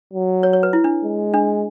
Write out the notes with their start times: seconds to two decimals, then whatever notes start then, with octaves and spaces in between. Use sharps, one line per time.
0.13 F#3
0.43 C#5
0.53 C#5
0.63 B4
0.73 E4
0.84 D4
1.04 G#3
1.34 D4